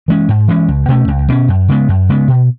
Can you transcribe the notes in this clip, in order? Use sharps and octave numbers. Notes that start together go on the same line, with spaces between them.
E3 G#3 C#4
G#2
E3 G#3 C#4
C#2
B2 A3 C#4
C#2
B2 A3 C#4
F#2
C#3 G#3 B3
F#2
C#3 G#3 B3
B2